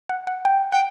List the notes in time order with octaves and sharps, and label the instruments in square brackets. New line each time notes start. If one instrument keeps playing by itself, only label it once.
[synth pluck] F#5
F#5
G5
[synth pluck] F#5 [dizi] G5